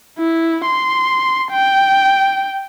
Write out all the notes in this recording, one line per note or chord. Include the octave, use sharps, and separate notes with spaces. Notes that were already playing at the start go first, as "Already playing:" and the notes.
E4
C6
G5